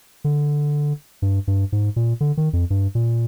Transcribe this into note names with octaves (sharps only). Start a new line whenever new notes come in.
D3
G2
G2
G#2
A#2
D3
D#3
F2
G2
A#2